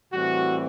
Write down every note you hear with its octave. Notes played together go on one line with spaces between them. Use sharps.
A2 E3 G3 C4 F#4